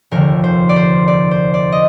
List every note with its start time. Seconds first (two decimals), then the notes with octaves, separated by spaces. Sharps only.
0.11 F1 D#2 D3 F3 A#4
0.44 C5
0.69 D5
0.76 C5
1.08 D5
1.31 C5
1.54 D5
1.72 D#5